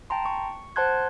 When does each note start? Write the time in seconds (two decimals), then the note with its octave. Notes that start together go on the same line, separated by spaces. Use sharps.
0.10 G5 A5 A#5 C6
0.26 C#6
0.76 C5 F#5 A5 C6 F#6 G#6